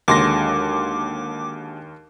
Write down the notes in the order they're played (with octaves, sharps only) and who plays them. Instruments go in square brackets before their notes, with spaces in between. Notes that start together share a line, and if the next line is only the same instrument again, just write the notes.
[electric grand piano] D#2 C6 A#6 [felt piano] D3 F#3 G#3 [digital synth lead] D6